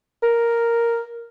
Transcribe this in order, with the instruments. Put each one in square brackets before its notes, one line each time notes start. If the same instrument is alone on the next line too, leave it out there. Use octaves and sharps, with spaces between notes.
[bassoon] A#4